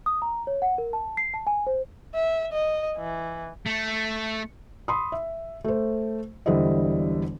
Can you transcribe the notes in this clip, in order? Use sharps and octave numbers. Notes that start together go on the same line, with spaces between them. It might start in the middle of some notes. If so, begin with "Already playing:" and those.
D#6
A#5
C#5
F#5
A#4
A5
C7
A5
G#5
C5
E5
D#5
E3
A3
B5 C6 D#6
E5
A3 C5
E1 D3 G3 E4 C5 D#5